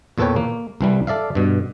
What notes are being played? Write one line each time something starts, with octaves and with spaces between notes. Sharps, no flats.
E2 A#2 A4 B4 C#5 G5
A#3
C2 E3 G3
A4 D5 E5 F5
G2 B2